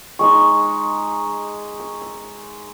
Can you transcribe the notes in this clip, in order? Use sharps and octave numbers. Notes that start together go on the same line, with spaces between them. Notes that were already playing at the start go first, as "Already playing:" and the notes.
G#3 D#4 C#6
E6
E6